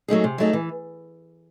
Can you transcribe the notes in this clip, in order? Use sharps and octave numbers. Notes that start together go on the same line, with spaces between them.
F#3 A3 D#4 G#4
C3
F#3 A3 D#4 G#4
E3